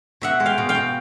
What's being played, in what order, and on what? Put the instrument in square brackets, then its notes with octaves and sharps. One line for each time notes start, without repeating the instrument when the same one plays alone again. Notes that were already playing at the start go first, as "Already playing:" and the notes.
[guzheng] B2 E5 F#5
G#3
F5 G5
B2
F5 G5
B2